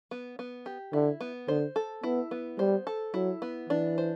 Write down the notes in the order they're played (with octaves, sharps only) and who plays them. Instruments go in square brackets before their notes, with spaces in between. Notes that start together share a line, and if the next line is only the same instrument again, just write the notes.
[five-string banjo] B3
B3
G4
[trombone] D3 [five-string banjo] E4
[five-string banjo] B3
[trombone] D3 [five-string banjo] C5
[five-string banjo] A4
[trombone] B3 [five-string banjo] E4
[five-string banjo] B3
[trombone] G3 [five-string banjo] C5
[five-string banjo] A4
[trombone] F#3 [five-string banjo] E4
[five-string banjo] B3
[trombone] E3 [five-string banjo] D4
[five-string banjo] C5